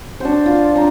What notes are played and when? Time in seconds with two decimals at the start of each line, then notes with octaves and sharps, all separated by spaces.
0.20 D4 F#4 C5
0.46 F4
0.75 D4 A#5